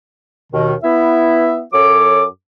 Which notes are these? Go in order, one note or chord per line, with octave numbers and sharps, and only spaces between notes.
D#2 B2 D#3
B3 E4 E5
F#2 F#3 A4 C#5 D6